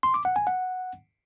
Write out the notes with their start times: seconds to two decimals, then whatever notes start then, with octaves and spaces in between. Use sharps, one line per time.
0.03 C6
0.14 D6
0.25 F#5
0.36 G#5
0.47 F#5